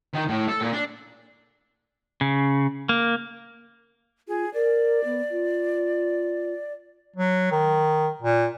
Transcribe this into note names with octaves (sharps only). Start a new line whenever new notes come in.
D#3
A2
A4
A#2
D4
C#3
A#3
F4 G#4
A#4 D5
B3
F4
F#3
D#3
A#2